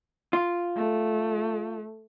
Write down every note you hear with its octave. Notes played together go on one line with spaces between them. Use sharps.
F4
A3